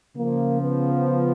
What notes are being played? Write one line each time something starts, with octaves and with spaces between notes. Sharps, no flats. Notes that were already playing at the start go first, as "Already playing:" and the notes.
C#3 F3 A#3
B3